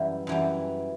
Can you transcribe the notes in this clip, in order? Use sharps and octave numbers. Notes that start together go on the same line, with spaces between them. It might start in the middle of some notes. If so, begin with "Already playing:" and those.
Already playing: F#2 E3 G3
F#2 E3 G3